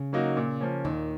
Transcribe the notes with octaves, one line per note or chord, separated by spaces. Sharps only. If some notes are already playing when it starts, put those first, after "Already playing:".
Already playing: C#3
F#3 A#3 D#4 F#4
A#2
F3 A#3 C#4
D#2 A#2 D#3